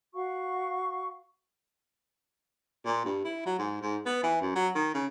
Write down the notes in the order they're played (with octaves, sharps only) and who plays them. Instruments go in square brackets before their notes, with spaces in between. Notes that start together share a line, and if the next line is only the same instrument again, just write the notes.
[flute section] F#4 F5 C#6
[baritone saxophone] A#2
G2
E4
F#3
G#2
G#2
B3
E3
F#2
F#3
D#3
C#3